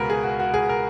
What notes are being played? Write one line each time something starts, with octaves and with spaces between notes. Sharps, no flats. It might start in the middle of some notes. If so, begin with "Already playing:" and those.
Already playing: C#2 B2 G#3 F#4 A#4 B4
G#4
F#4
F#4
G#4
A#4